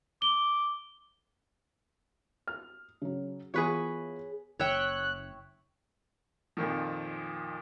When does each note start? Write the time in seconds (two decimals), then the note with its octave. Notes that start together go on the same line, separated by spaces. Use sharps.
0.22 D6 G7
2.47 F6
3.02 C#3 F#3
3.54 E3 B3 F4 G#4 B4 C#5
4.59 F#1 C#5 E5 G5 F#6
6.57 F2 A#2 D#3 F3